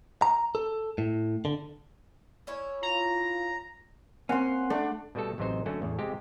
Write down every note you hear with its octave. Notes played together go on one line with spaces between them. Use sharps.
A#5
A4
A2
D3
C#4 E4 C#5
F4 A#5
A#3 C4 C#4 F#5 C6
A3 D4
B2 G3 A3 F#4 A4
A1 C3 F#3 D#4 C5
D3 F#3 A3 C#4 F#4
E2 A2
C3 G#3 C4 G4